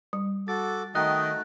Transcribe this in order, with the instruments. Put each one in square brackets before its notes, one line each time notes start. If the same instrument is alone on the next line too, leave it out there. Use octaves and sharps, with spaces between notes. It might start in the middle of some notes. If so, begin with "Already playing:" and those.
[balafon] G3
[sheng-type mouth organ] F#4 A4 D6 [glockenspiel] A6
[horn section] D#3 D#5 G5 [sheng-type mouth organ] A3 D#4 F#4 [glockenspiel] F#6